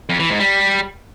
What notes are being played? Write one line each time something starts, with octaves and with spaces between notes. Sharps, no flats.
F2
E3
G#2
G3